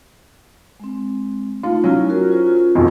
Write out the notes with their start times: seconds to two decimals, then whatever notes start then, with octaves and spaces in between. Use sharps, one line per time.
0.80 G#3 C4
1.63 A3 D#4 F4
1.84 F#3 C#4 D#4 E4 G#5
2.09 F4 F#4 A#4
2.31 F4 C5
2.75 E1 B1 F2